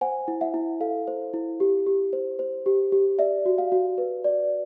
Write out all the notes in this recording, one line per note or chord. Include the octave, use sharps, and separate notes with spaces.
C5 F#5 G#5
E4
E5 F#5
E4
A4 F5
C5
E4
G4
G4
C5
C5
G4
G4
D5 E5
F#4
F5
F#4
B4
D5